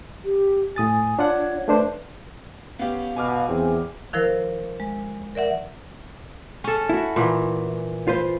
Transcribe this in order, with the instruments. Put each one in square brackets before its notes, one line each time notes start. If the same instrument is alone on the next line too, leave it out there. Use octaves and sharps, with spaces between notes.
[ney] G4
[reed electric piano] A2 D#6 A6 [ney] G#5
[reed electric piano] D4 F4 F#5 [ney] C#5
[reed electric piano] A3 D4 C5 [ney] B4
[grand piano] B3 C#4 G4 [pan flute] F5
[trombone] B2 [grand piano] G#5 D6 F6
[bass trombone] E2 [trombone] C4
[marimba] D#3 F3 E4 A#4 C5
G#3
A#4 D5 E5 F#5
[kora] C#4 A4
[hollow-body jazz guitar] E4 F#4
[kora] A#2 E3
[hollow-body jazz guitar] F4 B4 C5